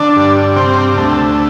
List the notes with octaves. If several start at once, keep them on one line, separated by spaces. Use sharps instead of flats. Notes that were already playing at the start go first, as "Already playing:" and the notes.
Already playing: D3 D4
G2
C3 C4
D2 A3